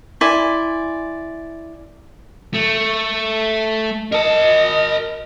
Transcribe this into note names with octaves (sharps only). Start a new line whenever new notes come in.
E4 D5 G#5 C6
A3
A#4 D#5 A5